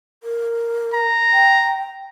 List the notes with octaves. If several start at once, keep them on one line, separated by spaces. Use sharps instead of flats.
A#4
A#5
G5